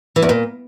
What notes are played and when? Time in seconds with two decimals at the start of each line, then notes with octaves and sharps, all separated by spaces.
0.16 E3
0.22 E2
0.29 A#2